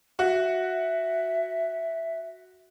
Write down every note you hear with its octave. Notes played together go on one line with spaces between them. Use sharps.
F#4 E5